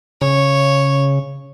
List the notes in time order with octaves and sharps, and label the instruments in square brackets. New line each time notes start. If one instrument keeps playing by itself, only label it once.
[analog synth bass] C#3 [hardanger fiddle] C#5